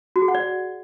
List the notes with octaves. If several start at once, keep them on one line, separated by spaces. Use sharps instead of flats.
F#4
G#4
F#5
D5